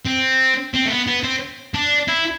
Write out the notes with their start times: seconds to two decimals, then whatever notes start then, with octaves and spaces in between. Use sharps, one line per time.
0.05 C4
0.74 C4
0.86 A3
0.90 B3
1.07 B3
1.23 C4
1.74 D4
2.08 E4